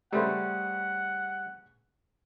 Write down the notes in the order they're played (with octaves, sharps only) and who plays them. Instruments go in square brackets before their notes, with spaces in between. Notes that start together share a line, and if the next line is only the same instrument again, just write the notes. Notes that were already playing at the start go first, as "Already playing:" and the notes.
[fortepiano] C#3 A3 B4 [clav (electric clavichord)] G3 C5 [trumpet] F#5